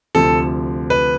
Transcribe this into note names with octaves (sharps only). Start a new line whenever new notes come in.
D2 C3 F3 A4
B4